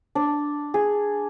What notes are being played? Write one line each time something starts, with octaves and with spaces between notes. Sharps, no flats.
D4
G#4